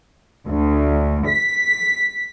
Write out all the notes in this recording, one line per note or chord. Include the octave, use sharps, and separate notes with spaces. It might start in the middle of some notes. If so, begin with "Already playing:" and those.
D2
B6